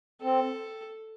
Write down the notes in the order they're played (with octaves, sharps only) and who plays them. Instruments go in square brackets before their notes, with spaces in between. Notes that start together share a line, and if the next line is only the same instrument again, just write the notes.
[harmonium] C4 [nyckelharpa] A4